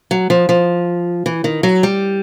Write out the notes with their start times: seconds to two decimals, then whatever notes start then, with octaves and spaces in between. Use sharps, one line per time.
0.11 F#3
0.30 F3
0.49 F3
1.26 E3
1.44 D#3
1.63 F#3
1.83 G3